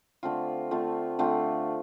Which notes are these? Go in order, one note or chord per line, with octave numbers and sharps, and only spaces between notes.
D3 A3 C4 F4
D3 A3 C4 F4
D3 A3 C4 F4